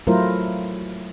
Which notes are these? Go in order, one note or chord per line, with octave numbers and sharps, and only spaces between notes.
F#3 A3 E4 F4 A#4 C5